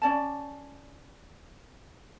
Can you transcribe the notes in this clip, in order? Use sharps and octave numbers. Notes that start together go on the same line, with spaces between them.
C#4 D5 A5